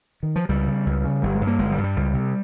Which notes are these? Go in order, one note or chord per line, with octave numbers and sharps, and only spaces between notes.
D#3
F3
C#2 G3
C#3
C#2
C#3
G1 G3
G#3
G2
A#3
G1 G#3
G3
G2
G3
C#2
C3